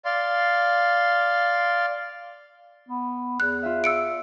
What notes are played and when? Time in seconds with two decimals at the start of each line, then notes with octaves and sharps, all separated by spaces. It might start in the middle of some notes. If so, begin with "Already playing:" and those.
0.05 D5 F5 C6
2.88 B3
3.40 E2 F#6
3.63 F4 E5
3.84 E6 C#7 D7